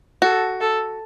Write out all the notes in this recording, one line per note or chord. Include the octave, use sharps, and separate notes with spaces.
F#4 A4
A4